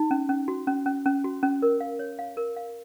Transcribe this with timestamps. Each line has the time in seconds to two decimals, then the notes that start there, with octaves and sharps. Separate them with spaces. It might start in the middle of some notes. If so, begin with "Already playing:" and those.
Already playing: D#4
0.11 C#4
0.29 C#4
0.48 F#4
0.67 C#4
0.86 C#4
1.06 C#4
1.24 F#4
1.43 C#4
1.62 A#4
1.80 F5
1.99 C#5
2.19 F5
2.37 A#4
2.56 F5